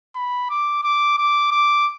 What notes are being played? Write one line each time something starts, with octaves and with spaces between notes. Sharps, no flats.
B5
D6
D6
D6
D6